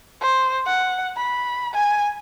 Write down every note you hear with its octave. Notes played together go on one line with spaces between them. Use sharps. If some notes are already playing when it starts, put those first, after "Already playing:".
C5
F#5
B5
G#5